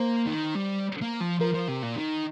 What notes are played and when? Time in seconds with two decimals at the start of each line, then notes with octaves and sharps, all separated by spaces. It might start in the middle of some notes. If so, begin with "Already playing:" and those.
Already playing: A#3 C5
0.27 D#3
0.55 G3
1.02 A#3
1.21 F3
1.40 F3 A#4
1.54 F3
1.68 C3
1.83 A#2
1.96 D#3